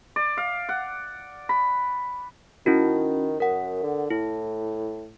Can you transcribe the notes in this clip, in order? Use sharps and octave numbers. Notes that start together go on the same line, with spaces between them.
D5
F5
F#5
B5
D#3 C#4 E4 F#4
F#2 A#4 F#5
D3
A2 E4